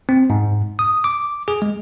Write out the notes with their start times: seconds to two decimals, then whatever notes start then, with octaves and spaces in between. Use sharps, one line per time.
0.09 C4
0.30 G#2
0.79 D#6
1.04 D6
1.48 G#4
1.62 G#3